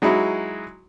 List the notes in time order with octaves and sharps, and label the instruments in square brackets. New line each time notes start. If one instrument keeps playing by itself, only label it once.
[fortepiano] F#3 G#3 D#4 E4 F#4